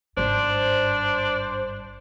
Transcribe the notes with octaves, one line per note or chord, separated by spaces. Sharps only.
G#1 G2 D4 C5